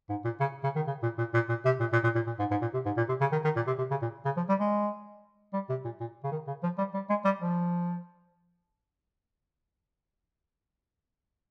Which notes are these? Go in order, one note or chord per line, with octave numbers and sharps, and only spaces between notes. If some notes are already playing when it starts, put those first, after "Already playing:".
G#2
A#2
C#3
C#3
D#3
C#3
A#2
A#2
A#2
A#2
C3
A#2
A#2
A#2
A#2
A#2
G#2
G#2
A#2
C3
G#2
A#2
C3
C#3
D#3
D#3
A#2
C3
C3
C#3
A#2
C#3
F3
G3
G#3
G3
C3
A#2
A#2
C#3
D#3
C#3
F3
G3
G3
G#3
G3
F3